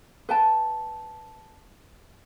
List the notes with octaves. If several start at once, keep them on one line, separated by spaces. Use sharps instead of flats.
B4 G5 A5